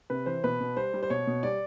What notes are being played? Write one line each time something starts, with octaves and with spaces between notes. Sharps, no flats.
C3 B4
E3 C5
B2 B4
B2
G3 C5
G3
C5
B2 C#5
B2
G3 D5